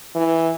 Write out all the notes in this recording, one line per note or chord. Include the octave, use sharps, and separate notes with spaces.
E3